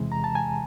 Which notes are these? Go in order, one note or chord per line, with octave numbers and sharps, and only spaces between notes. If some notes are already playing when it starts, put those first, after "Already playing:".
Already playing: E2 C3 E3 G#3
A#5
A5
G#5